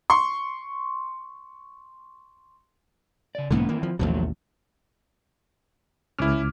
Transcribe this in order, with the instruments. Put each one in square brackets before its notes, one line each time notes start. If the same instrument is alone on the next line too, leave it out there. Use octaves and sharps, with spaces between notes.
[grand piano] C6 C#6
[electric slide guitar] C#3 D5
[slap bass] B1 G#2 D3 [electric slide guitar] A#3 B3 C#4
[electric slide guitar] D#3 E3 C4 [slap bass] A#3
[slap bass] F3
[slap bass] A1 D#2 B2 [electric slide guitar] F3 F#3 A3
[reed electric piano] C#2 D6 F6 [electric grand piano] C#4 E4